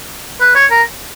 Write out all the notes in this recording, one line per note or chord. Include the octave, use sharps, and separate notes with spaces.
B4
C#5
A#4